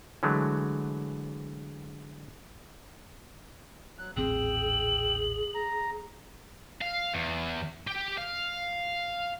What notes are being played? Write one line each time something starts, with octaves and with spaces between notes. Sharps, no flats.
D3 E3 F#3 G#3 A3
F#3 F#6
D#1 A1 C4 G#4 G5 E6 F#7
A#5
F5
E2
G4
F5